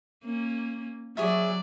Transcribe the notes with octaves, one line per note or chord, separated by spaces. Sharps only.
A#3 C#4
F#3 G#4 C#5 D5 E5